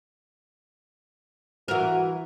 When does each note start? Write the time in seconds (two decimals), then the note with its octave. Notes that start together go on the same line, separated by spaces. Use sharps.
1.68 E3 F#4 A#4